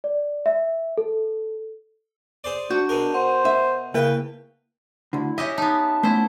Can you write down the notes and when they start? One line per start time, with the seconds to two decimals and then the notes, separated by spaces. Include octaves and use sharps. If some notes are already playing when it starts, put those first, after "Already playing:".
0.04 D5
0.46 E5
0.98 A4
2.44 G#4 C5 D5
2.70 D4 F#4 G6
2.89 B2 G#4 A#4
3.14 C5 F#5
3.45 E5 F#5
3.94 C#3 A#3 A#4 B4 G5
5.13 D2 D3 E4
5.38 C#4 G4 D#5 E5
5.58 B3 D#4 A5
6.03 A3 B3 C#4 E4 C5